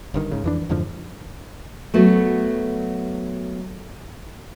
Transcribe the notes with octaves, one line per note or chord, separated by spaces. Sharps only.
G1 G2 D#3
G#2 C#3
F2 E3 D4
F2 G#2 D3 F3
F#3 A3 B3 F#4